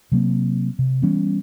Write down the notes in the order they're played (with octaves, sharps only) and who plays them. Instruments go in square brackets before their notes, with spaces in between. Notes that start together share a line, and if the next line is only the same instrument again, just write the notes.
[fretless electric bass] C3 F#3 A#3 C4
C3
E3 G3 B3 C#4